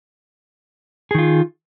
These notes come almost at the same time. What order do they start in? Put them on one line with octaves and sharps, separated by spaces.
G#4 D#3 F4